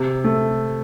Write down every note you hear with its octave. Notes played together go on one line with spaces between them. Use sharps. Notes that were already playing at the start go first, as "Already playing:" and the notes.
Already playing: C3
A3